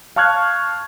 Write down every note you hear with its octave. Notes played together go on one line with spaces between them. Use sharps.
F5 A5 C#6 F6 F#6 G#6